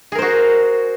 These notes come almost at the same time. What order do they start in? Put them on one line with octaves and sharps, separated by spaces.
G#4 A#4 C5 F#4